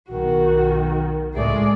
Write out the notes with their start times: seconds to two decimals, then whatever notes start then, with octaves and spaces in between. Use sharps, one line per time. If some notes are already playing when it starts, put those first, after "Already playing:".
0.10 B1 D#3 F#4
1.35 C#2 A2 G#3 A3 G#4 D5